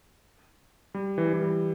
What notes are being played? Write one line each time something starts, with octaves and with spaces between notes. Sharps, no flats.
G3
E3
G3
E3
G3